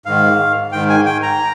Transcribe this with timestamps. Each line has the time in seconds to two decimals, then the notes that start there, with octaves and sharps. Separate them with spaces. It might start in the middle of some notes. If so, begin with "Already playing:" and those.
0.06 G#2 D#3 F5
0.72 G#2 D#3 G5
0.89 G#5
1.06 G5
1.23 A#5